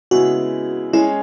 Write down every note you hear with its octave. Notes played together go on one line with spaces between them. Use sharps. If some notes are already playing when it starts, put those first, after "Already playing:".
C#3 G#3 B3 E4 F#4
G#3 C#4 E4 G#4